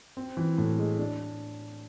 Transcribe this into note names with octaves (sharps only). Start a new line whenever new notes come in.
C4
E3
A2
G#3
D4